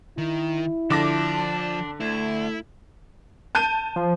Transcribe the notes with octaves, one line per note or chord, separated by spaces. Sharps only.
D#3 E4
D3 F3 D4 D6 A#6
D2 A3 E4
A5 G6 D#7
F3